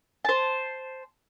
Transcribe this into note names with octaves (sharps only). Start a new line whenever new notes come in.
C5 A5